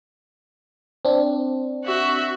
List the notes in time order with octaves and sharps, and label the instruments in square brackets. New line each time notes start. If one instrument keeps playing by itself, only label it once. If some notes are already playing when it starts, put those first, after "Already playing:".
[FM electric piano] C4 D4
[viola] F#4 E5